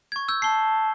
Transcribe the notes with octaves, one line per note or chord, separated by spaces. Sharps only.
C#6 G#6
E6 G6
A5 C7 G7